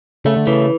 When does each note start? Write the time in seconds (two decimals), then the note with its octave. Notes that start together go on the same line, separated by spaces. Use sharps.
0.25 C#3 A3
0.36 D3
0.47 C#3 E3